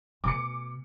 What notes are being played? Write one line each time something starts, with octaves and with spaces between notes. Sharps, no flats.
B2 A3 D6 C#7